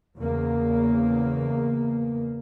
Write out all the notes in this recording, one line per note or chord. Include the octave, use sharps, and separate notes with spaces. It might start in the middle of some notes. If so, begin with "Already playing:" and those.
E2 C#3 A#3